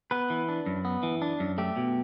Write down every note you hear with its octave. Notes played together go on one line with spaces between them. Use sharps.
B3 B4
E3
D4
F#2
B3
E3
D4
F#2
A3 G4
B2